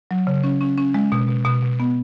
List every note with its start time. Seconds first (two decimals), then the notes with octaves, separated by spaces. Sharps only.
0.11 F#3
0.27 C#3
0.43 C#4
0.61 C#4
0.78 C#4
0.94 G#3
1.12 B2
1.28 B2
1.45 B2
1.62 B2
1.80 B3